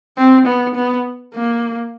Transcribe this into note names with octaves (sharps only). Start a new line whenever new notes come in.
C4
B3
B3
A#3